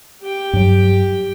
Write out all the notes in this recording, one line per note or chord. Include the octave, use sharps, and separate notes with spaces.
G4 G5
G2 F#3